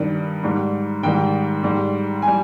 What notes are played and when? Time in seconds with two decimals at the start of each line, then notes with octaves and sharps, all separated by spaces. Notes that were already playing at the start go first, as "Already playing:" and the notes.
Already playing: G2 D#3 G3
0.43 G#2 G3
1.03 G#2 D#3 G3 G5
1.63 G#2 G3
2.22 G#5
2.28 G3